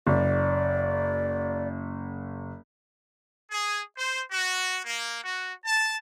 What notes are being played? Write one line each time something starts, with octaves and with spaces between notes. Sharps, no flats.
F#1 D5
G#4
C5
F#4
A#3
F#4
A5